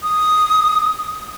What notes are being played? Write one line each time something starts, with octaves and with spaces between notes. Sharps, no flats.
D#6